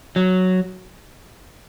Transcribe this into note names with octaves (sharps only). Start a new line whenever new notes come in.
F#3